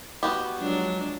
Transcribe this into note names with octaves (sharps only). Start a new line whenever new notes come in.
B3 F#4 G4
F3 F#3 G#3 D4